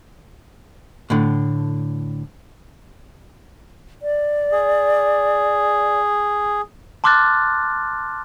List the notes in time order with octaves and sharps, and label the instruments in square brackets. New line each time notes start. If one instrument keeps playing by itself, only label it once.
[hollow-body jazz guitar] A2 D3
[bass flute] D5
[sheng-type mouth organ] G#4
[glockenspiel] A5 C6 D6 F6 F#6 A6